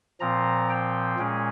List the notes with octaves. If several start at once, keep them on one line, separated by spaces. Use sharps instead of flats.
A#2 F3 C4 A#5
G5
A#2 G#3 C#4 G#4